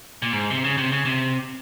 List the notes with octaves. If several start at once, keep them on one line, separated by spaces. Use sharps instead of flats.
A#2
G#2
C3
C#3
C3
C#3
C3